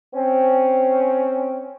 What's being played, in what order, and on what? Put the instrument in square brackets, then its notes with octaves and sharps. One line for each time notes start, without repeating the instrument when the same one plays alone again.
[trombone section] C4 C#4